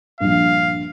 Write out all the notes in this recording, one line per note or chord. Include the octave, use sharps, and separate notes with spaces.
A#1 G2 F5